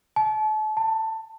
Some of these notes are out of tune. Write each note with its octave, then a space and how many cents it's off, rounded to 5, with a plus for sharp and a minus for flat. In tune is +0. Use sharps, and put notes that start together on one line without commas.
A5 -35
A5 +15